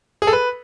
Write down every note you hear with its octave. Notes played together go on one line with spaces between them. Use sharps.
G#4
A4
B4